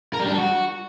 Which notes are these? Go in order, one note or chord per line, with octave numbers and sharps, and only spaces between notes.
A#4
G3
D4
G3
F#4